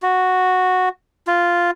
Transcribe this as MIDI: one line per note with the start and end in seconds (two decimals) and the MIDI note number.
0.02 0.89 66
1.27 1.71 65